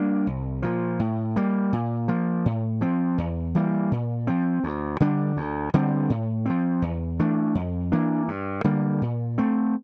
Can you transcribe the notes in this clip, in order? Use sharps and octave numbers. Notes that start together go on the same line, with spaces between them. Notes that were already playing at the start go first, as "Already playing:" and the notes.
Already playing: G3 A#3 D4
C2
A#2 F3
A2
G3 A#3
A#2
F3 A#3
A2
F3 C4
E2
E3 G3 A#3
A#2
F3 C4
D2
D3 G3 D4
D2
D3 G3 C4
A2
F3 C4
E2
E3 A3 D4
F2
E3 A#3 D4
G2
D3 G3 A#3
A#2
A3 C4